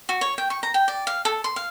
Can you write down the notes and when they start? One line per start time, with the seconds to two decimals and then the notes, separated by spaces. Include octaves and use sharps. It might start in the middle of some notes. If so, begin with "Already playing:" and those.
0.09 F#4
0.21 C#5
0.38 G5
0.50 C#6
0.63 A#5
0.74 G5
0.88 D5
1.07 F5
1.25 A4
1.44 C6
1.56 F5